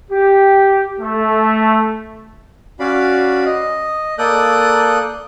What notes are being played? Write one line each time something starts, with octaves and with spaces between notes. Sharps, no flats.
G4
A3
C#4 F#4 D5 F5 B5
D#5
A#3 A4 D5 D#6 F#6 G6